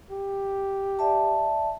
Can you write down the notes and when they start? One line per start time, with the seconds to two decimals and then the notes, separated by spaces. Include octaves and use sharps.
0.11 G4
0.99 D5 E5 A5